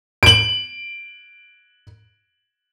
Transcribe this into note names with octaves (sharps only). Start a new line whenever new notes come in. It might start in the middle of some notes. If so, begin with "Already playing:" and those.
D7 F#7